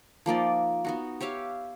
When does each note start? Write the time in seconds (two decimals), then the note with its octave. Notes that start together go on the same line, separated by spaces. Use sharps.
0.26 F3 A#3 D#4 D5
0.85 B3 D#4 F#4
1.21 G4 C#5 E5 F5